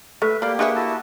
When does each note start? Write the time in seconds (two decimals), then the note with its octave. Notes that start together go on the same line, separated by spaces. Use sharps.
0.22 A3 A4 B4 E5
0.42 A#3 G4 D5 F5 G5 B5
0.59 D4 G#4 B4 E5 C#6 D#6
0.75 E4 F#4 A5